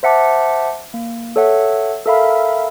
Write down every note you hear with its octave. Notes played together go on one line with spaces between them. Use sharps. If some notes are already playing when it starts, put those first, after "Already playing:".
C5 E5 F#5 A5 D6
A#3
A4 C#5 E5 F#5
A4 A#4 E5 F5 B5